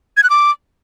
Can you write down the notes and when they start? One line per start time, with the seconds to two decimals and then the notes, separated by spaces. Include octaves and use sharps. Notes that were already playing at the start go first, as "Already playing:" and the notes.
0.17 G#6
0.23 F#6
0.30 D6